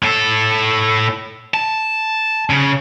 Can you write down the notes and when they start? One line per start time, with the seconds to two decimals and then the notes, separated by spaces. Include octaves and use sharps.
0.03 A2 A4
1.54 A5
2.50 C#3